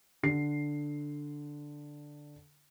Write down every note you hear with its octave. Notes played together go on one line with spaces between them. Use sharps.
D3 C7